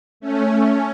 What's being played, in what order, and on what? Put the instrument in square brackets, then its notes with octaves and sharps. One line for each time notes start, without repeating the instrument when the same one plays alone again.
[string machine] A3 C#4